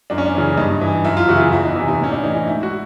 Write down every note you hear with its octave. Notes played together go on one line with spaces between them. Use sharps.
F#2 D4
C#4
D4
C#3 E3
G2 D#4
E3
F#2 E4
F4
C#3 E3 F#4
E4
F4
E2 E4
D#4
C3 E3 E4
D#4
A2 C#4
D4
E3 D#4
D#4
G#2 E4
F#4